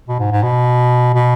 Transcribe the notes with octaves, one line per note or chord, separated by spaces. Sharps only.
B2
G#2
G#2
B2
B2